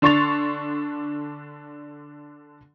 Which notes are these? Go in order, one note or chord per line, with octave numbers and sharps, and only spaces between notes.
D3 D4 C6 C#6 A6 F7